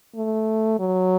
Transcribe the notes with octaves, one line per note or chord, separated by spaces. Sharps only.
A3
F#3